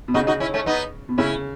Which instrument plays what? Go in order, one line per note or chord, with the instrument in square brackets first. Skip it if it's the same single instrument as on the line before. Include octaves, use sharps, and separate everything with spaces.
[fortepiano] B2
[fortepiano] C#3 [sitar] D#4 F#4
[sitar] D#4 F#4
C#4 E4
A3 C#4
B3 D#4
[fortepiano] B2
[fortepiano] C#3 [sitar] C#4 E4